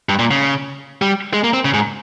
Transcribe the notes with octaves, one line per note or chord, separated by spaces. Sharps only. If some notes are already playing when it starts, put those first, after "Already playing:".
G2
A#2
C#3
G3
G#3
A#3
C4
C#3
G#2